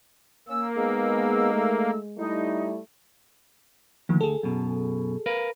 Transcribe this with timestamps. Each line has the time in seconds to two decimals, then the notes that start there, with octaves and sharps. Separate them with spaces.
0.48 A#3 C#4 E6
0.77 G#3 B3 D#4 G#4 E6
1.54 A3
2.18 G3 A3 D#4 E4
4.09 D2 D#3 F3 A#3
4.21 G#4 A4
4.43 F#2 B2
5.26 A#4 B4 F5